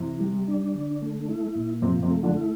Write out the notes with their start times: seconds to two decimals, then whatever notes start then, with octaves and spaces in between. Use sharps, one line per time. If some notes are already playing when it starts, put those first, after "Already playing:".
Already playing: C3 E3 C4
0.20 G3
0.47 D4
0.74 D3
1.01 A3
1.29 E4
1.55 A#2
1.82 C3 F3 C4
2.02 C3 C4
2.10 A3
2.23 D3 D4
2.37 E4